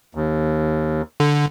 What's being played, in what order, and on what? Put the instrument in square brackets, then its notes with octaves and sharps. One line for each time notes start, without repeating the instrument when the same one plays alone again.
[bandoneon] D#2
[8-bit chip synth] D3